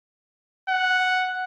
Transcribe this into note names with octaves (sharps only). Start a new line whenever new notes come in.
F#5